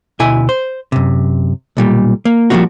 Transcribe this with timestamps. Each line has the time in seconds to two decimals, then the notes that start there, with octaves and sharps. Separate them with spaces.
0.19 D2 B2 E4 G#5
0.49 C5
0.92 F#2 C3
1.77 B1 A#2 G3
2.25 A#3
2.50 F3 G3 A3 A#3 D#4 F#4